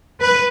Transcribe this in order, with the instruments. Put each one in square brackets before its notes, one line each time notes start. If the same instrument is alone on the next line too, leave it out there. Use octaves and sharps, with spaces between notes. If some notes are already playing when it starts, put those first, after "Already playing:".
[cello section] B4